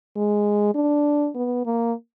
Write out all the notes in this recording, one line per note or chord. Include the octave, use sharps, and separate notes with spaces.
G#3
D4
B3
A#3